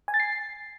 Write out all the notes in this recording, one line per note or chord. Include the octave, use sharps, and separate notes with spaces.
G#5
A6
C7